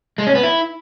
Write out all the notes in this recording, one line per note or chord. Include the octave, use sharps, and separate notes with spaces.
G#3
C#4
B3
E4